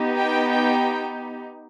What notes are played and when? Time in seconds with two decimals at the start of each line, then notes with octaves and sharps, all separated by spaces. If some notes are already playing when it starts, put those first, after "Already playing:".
Already playing: B3 D#4 G4
0.19 G5
0.50 G5